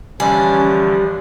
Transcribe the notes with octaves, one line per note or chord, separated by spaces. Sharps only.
D3 E3 F3 G3 C#4 G#5